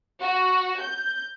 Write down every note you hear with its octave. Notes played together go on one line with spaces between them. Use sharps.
F#4
G6